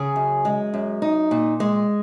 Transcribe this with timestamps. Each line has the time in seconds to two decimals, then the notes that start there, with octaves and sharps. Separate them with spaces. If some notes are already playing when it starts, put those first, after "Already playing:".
Already playing: C#3 G#4
0.16 F#2
0.45 G#3
0.74 F#2
1.02 D#4
1.31 A#2
1.60 G#3